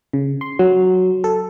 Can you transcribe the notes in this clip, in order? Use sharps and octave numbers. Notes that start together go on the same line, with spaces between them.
C#3
C6
F#3
A4